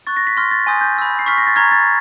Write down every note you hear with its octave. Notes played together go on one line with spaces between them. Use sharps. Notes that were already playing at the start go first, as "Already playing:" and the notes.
C#6 F#6 A6
A#6
B6
C6 F6 A#6
A6
G#5 C6 D#6 G6
G6
B5 E6 G6
C7
C#6 F6 B6
A#6
A6
A#5 C#6 F6 G#6
A6